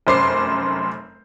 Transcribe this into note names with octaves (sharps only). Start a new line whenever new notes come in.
F1 F#2 C5 D6 C7